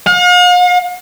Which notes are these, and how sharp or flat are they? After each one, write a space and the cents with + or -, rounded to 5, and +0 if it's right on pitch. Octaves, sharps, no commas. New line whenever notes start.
F5 +45